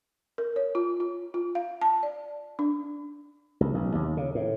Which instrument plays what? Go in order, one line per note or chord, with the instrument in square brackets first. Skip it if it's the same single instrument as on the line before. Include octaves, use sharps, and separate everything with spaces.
[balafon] A#4
C#5
F4
F4
F4
F5
A5
D5
D4
[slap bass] C#2
B1
D#2
C#3
A2